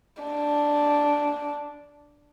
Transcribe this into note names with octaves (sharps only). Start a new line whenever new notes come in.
D4